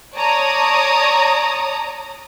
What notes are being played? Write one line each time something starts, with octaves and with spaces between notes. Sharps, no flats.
C#5 D5 A5 A#5 D#6